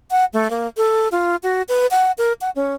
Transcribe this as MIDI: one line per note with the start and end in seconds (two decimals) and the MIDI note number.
0.11 0.25 78
0.33 0.48 57
0.50 0.67 58
0.77 1.08 69
1.12 1.36 65
1.43 1.62 66
1.69 1.87 71
1.91 2.11 78
2.18 2.33 70
2.41 2.50 78
2.56 2.75 61